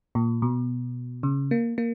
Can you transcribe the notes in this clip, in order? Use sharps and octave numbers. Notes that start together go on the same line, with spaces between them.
A#2
B2
C#3
A#3
A#3